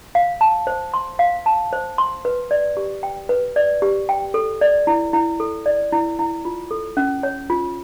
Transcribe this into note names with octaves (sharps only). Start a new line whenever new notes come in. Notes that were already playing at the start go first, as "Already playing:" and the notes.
F5
A5
C5
C6
F5
A5
C5
C6
B4
D5
G4
G5
B4
D5
G4
G5
A4
D5
E4
E4
A4
D5
E4
E4
F4
A4
C#4
C#5
F4